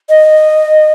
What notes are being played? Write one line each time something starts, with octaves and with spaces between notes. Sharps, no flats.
D#5